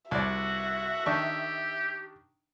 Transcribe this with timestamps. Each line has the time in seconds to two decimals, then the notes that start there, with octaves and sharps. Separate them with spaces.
0.11 C2 F#4 D5 E5
1.06 D#3 D4 G4 C#6